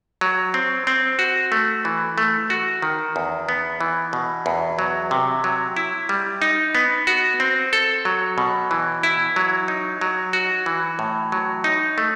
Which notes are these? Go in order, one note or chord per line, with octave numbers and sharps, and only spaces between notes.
F#3
C4
C4
F#4
A3
E3
A3
F#4
D#3
E2
B3
E3
B2
E2
F#3
C3
F#3
E4
G3
D#4
B3
F#4
C4
A4
F#3
B2
E3
E4
F#3
D#4
F#3
F#4
E3
A2
F#3
D#4
A3